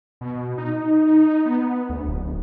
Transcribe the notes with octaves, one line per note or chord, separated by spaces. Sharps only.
B2
D#4
B3
D2
D1